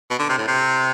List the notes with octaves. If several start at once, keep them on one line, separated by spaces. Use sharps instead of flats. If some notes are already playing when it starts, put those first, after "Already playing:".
B2
D3
C3
A2
C3